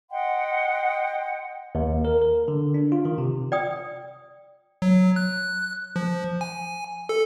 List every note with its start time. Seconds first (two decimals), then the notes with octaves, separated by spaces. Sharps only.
0.10 D#5 F#5 G5 C6
1.75 D#2
2.05 A#4
2.22 A#4
2.48 D3
2.74 D4
2.92 F4
3.05 D#3
3.18 C3
3.52 D5 G5 D#6
4.82 F#3
5.16 F#6
5.96 F3
6.41 G#5
7.09 A4